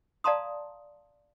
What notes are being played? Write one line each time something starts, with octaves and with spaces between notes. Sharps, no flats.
D5 F5 A5 A#5 C6 D#6